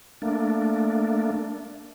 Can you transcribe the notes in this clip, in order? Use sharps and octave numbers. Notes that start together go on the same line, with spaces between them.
A3 A#3 D4